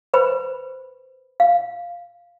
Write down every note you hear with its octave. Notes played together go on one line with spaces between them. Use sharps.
B4 C5 B5
F5